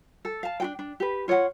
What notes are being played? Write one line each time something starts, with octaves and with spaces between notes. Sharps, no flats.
A4
F5 A5
D4 F#4 G5
D4
G4 B4
F4 C#5 D5 F#5